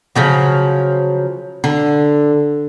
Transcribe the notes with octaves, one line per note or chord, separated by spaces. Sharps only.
C#3 F3 F#3
D3